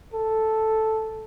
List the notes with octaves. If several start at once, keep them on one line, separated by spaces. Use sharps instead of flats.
A4